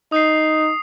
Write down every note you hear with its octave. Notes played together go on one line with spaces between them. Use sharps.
D#4 D#6 C7